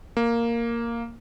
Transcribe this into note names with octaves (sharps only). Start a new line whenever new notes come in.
A#3